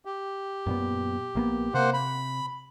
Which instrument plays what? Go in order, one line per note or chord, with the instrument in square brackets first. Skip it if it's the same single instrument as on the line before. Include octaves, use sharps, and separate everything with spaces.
[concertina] G4
[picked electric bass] F#2 A#2 B3
A#1 A#3 B3
[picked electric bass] C3 [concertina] A#3 C5 F#5
[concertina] B5